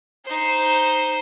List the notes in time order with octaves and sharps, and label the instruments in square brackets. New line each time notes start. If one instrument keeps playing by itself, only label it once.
[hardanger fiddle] D#4 C5